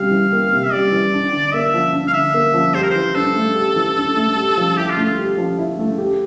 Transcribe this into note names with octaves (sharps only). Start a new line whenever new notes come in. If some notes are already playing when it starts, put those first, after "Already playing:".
Already playing: C3 G3 F5
E3
A#3
C3
E5
G3 D5
E3
D4
D3
A#3 E5
F3
D4
F5
D3 E5
A#3
F3
G4 C5
A#4
C5
E3
D4 A4
A3
G4
E3
D4
A3
G4
F3
E4 G4
F4
A3
F4
G4
F3
E4
A3
G4